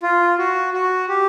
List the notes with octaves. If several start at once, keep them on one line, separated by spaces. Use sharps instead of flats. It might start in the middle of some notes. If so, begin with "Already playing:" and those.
F4
F#4
F#4
G4